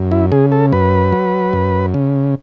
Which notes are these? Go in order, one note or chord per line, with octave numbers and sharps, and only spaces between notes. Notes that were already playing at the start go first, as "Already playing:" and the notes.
Already playing: F#2
E4
C#3 G#4
A4
F#2 B4
F#3
F#2
C#3